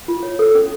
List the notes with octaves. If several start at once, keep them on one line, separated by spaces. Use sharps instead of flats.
F4
C#5
A4
C#4